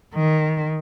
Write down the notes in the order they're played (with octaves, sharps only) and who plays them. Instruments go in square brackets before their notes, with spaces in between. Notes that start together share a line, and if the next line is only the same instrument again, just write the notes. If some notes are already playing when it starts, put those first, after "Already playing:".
[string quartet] D#3